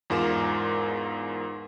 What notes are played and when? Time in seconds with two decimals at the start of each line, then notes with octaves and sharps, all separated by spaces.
0.10 E2 G#2 F4 A#4 D6 E7